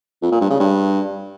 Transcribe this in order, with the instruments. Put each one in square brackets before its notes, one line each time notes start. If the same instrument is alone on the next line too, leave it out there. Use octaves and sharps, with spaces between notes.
[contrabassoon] F2
A#2
G2
C#3
G2